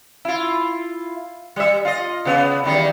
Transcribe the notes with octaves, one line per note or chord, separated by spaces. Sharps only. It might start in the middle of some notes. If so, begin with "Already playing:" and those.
E4 F4
G3 E5
F4 D#5
C#3 B3
E2 D#3 G3